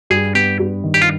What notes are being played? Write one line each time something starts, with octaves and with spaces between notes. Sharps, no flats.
G2 G#4
B3 G4
G2
D#3
G4
F4